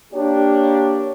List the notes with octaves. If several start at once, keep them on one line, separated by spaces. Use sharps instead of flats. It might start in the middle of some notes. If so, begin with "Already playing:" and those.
A#3 D4 G4 C#5